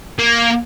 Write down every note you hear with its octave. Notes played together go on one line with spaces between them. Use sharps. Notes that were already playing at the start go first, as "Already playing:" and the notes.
A#3